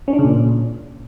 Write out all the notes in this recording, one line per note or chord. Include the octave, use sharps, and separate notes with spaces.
C#4
D4
C#3
A#2